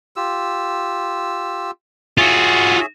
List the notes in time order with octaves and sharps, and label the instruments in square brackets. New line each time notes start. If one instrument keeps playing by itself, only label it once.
[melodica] F4 G4 E6
[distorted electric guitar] F4 F#4 [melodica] G#4 C#5 E5